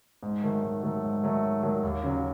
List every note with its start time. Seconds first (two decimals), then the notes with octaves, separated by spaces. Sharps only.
0.23 G#2
0.43 D#3 F#3 A3
0.63 G#2
0.83 D#3 F#3 A3
1.04 G#2
1.23 D#3 F#3 A3
1.43 G#2
1.62 D#3 F#3 A3
1.83 D#2
2.03 C#3 F#3